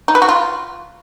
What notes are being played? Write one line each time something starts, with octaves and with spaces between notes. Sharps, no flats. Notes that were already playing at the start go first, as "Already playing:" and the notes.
D#4
B4
F#4
F4